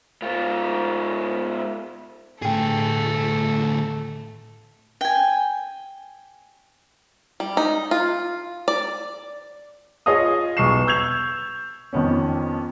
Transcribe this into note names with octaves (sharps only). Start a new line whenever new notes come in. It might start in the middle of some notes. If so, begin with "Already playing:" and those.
G#2 F4
D2 A2 A3 G#4 G5
G5 G#5
G3
D#4
F4
D5
F4 G#4 C#5 D#5 F5 D#6
B1 E2 C#6 C7 E7
C#6 E6 G6 G#6 F7
F2 D#3 B3 C#4